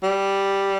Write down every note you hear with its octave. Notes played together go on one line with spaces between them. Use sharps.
G3